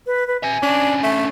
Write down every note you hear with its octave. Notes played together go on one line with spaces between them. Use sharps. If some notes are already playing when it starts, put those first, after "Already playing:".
B4
B4
E5 G#5 A#5
D3 C#4 D4
A3